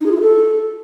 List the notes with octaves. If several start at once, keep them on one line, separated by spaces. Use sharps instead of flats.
D#4
G#4
F4
E4
A4